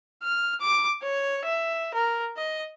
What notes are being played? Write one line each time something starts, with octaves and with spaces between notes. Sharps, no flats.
F6
D6
C#5
E5
A#4
D#5